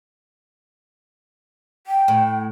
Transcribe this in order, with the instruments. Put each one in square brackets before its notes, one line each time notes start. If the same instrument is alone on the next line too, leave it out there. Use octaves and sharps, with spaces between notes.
[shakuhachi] G5
[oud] A2